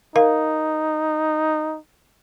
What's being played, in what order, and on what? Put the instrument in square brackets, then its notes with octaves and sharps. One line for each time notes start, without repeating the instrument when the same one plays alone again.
[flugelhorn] D#4 [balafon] A#4 F5